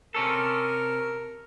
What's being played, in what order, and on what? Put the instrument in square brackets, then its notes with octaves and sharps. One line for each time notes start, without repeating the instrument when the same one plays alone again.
[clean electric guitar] C3 C#4 A4 [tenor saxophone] A#4